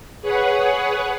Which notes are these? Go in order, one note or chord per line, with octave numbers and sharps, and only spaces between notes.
G#4 B4 C#5 F#5